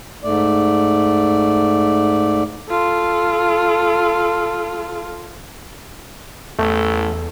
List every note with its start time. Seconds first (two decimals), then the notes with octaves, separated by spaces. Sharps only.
0.24 G#2 A3 D5
2.69 F4 A4
6.59 A1 E2 A3 A4